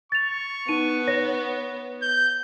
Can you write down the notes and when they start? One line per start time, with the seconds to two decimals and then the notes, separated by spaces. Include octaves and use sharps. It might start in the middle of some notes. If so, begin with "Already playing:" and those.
0.12 C#6 A6 F7
0.68 B3 D#4 D#7
1.07 C#5 A#6
2.02 G6